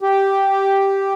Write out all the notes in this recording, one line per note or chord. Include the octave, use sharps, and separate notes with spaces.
G4